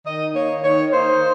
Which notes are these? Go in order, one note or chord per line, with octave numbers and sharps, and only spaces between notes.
D#3 D#5
A#3 D#4 C#5
D#3 C#5
A#3 D#4 C5